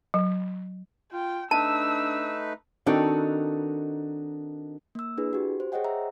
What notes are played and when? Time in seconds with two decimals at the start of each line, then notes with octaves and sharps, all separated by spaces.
0.14 F#3
1.13 F4 G5
1.51 A3 D4 D#4 B4 A5 E6
2.86 D#3 C4 D4 D#4 F#4 A4
4.95 A#3 E6
5.18 D4 E4 G#4 B4
5.33 F#4 G4
5.60 C5
5.72 G#4 C5 C#5 D#5 F#5 G5
5.84 E5 A#5